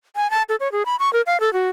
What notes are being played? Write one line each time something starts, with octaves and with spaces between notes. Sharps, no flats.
G#5
A5
A4
C#5
G#4
B5
C#6
A#4
F5
A4
F#4